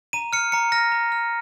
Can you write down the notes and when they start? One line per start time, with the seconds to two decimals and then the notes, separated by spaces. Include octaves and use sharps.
0.13 A#5 D#7
0.33 F6 C#7
0.52 A#5 C#7
0.72 F6 A#6
0.92 A#5
1.12 F6